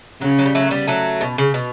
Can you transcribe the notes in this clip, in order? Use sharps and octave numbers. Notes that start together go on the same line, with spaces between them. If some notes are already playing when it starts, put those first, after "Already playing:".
C#3 F#3
F#3
G3
F#3 A3
G3 B3
F#3 A3
B2
C#3
B2